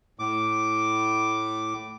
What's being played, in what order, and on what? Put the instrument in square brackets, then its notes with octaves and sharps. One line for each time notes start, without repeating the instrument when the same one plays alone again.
[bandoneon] A2 D6